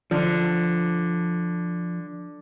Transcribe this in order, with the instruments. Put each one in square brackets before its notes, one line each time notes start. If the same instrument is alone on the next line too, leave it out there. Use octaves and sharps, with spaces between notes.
[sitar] D3 [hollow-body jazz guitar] F3